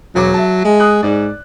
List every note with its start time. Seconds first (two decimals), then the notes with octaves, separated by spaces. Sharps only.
0.15 E1 F#3 C#5 D6
0.34 E5 A5
0.65 G#3
0.80 D#6 F#6
1.03 G#2 D5